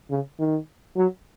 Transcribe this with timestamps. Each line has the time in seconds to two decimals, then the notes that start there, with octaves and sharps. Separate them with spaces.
0.11 C#3
0.39 D#3
0.97 F#3